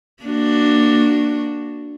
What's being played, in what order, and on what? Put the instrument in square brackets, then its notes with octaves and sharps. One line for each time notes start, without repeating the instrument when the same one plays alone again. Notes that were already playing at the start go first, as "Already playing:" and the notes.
[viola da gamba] A#3 D4 F#4